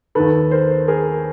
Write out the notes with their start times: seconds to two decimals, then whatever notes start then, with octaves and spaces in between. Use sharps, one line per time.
0.15 D#2 D#3 A4 B4
0.51 A#4 C5
0.88 G#4 A#4